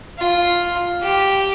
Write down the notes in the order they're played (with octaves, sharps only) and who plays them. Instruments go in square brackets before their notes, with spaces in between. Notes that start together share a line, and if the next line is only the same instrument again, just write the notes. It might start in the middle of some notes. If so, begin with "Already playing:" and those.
[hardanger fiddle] F4
G4